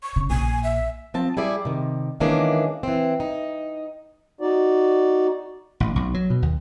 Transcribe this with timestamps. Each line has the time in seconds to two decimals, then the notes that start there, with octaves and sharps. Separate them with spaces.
0.03 C#6
0.16 C#3
0.30 A#1 G#5
0.64 E5
1.14 F3 C4 A5
1.37 G3 E4 G#4 D5
1.65 C3 D#3
2.20 D#3 E3 G#3 A#3 C#4 D4
2.83 E3 C4
3.20 D#4
4.41 D#4 F#4 D5
5.80 A1
5.96 B1
6.14 F#3
6.30 B2
6.42 D#2